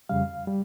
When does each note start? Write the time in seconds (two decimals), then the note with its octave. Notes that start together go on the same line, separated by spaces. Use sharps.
0.09 F2 C#3 G3 F5
0.47 G3